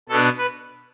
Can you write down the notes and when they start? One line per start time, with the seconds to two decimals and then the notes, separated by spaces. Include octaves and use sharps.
0.09 B2 B3 D4 A4
0.38 B4